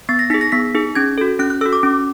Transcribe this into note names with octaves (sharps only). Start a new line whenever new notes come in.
B3 A6
A#6
D#4 G#4 B6
A#6
B3 B6
D#4 G#4
C#4 G#6
F#4 A4
C#4 F#6
F#6
F#4 A4 E6
D6
C#4